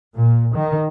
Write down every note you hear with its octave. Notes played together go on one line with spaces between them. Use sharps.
A#2
D#3